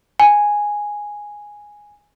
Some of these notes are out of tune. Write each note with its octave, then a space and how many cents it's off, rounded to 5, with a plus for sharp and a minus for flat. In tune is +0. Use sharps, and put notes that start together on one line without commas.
G#5 -5